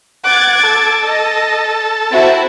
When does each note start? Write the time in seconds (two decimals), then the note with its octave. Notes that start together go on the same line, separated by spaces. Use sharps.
0.24 F#5 D6 G#6 A6
0.63 A4
1.04 D#5
2.10 C4 E4 F#4